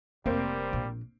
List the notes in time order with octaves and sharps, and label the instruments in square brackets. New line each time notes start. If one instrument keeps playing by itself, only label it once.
[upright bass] F1 [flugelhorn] G3 [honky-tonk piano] A#3 C4
[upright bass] A#1